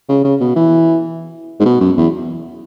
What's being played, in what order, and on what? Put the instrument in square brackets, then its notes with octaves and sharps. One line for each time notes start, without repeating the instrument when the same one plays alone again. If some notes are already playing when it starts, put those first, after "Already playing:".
[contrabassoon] C#3
C#3
B2
E3
G#2
B2
F#2
E2